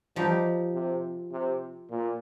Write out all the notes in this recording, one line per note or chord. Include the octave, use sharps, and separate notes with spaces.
F3 G3 D#4 G4
C3
C3
A#2